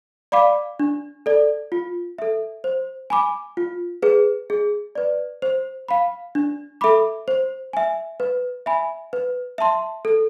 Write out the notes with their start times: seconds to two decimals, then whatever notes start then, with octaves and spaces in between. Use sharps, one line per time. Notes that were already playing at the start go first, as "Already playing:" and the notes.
0.32 D5 F5 B5 D6
0.79 D4
1.26 A4 D5
1.72 F4
2.18 A4 E5
2.64 C5
3.10 G#5 B5 D6
3.57 F4
4.02 G#4 B4
4.50 G#4
4.95 B4 D5
5.42 C5
5.88 F5 B5
6.35 D4
6.81 A4 E5 B5 D6
7.28 C5
7.73 E5 G#5
8.20 B4
8.66 E5 G#5 B5
9.13 B4
9.58 E5 A5 C6
10.05 A4